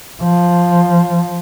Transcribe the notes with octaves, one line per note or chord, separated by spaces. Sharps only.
F3